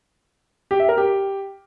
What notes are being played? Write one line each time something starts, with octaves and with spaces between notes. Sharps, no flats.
G4
E5
A#4
G4